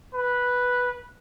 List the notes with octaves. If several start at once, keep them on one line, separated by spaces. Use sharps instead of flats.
B4